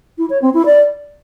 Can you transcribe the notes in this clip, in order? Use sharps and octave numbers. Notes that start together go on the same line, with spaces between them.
E4
C#5
C4
E4
D5